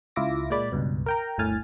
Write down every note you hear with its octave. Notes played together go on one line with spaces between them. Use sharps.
C#2 E4 F4 E5 D6 A#6
A#2 G#3 D5 B5
C#2 G2 B2
A#4 G5 A#5
G1 D2 A2 G#5 F6 A6